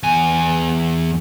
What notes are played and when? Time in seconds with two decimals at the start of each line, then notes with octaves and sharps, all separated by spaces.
0.04 E2 G#5